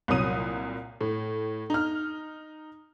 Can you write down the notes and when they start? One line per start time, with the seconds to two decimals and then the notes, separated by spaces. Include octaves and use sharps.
0.08 C2 A#2 F#3 D#6 D#7
1.01 A2
1.70 D#4 F6